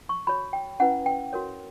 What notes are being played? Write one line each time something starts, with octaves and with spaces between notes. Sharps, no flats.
C#6
F#4 C#5 B5
G5
C#4 E4 B4 F#5
G5
F#4 A#4 C#5